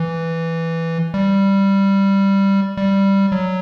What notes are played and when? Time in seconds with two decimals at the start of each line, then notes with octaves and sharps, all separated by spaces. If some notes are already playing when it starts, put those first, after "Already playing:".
Already playing: E3
1.14 G3
2.77 G3
3.32 F#3